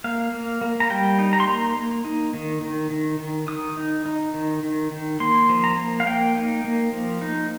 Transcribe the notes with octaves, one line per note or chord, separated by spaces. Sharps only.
A#3 F5
A#3
A#3
A#5
G3 G5
D#4
A#5
C6
A#3 A#5
A#3
D#4
D#3
D#3
D#3
D#3
D#3 D#6
D#4
D#4
D#3
D#3
D#3
A#3 C6
F3
A#5
A#3
F5
A#3 G5
D#4
A#3
F3
D#4